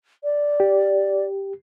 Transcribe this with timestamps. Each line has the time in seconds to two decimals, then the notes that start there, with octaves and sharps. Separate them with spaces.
0.24 D5
0.60 G4